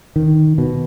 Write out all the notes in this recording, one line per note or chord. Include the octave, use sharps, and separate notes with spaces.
D#3
B2